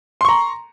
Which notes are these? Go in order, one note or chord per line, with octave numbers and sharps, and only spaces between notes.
A#5 C6 C#6